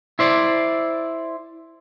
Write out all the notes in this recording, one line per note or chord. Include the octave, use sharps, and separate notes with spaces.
E4 C5 D5